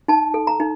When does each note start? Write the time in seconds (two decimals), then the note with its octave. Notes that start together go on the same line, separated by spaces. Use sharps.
0.08 D#4 A5
0.34 A4
0.47 A#5
0.60 D#4